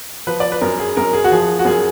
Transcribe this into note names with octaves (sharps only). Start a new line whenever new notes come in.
F3 B4
D5
B4
F#2 A#4
G#4
F#2 A#4
G#4
F#4
F3 G#4
F#4
F#2 G#4